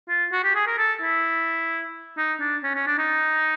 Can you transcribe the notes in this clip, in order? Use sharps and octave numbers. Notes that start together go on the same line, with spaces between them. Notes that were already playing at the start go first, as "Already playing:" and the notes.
F4
F#4
G4
G#4
A#4
A4
E4
D#4
D4
C#4
C#4
D4
D#4